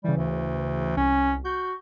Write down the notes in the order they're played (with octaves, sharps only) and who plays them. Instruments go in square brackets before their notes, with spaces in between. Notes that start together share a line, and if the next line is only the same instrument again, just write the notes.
[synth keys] C#3 E3 [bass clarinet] G3
[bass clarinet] D2
[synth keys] C2 [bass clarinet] C#4
[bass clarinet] F#4 [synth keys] G6